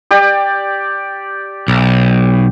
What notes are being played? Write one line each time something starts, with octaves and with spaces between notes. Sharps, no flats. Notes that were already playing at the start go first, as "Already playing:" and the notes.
G4 D5
B1